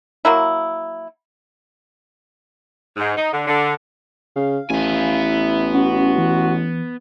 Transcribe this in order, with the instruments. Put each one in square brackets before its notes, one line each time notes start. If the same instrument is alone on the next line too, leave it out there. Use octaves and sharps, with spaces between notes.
[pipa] F#3 A#3 E4
[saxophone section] G#2
D#4
D3
D3
[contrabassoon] C#3 [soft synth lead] F5
[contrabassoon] A1 [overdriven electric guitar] B3 G#5 [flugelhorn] E4
[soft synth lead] C#4 [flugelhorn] F#4
[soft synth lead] E3